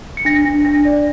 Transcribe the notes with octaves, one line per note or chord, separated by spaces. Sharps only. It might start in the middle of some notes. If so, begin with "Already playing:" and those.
C#7
D4 A#6
D4
D4 A#6
D5